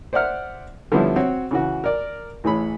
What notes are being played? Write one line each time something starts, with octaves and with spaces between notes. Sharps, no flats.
C5 D5 E5 F#5 F6
D3 F3 G3 B3 C#4 E4
C4 F#4 C#5
C#3 E3 F#4
A#4 D5
A1 E3 G#4 C#5 B5